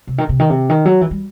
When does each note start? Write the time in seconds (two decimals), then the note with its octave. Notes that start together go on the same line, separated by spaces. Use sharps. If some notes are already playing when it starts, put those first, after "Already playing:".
0.07 C3
0.18 D#3
0.29 C3
0.39 D#3
0.50 C3
0.69 D#3
0.85 F#3
1.01 E3
1.11 G3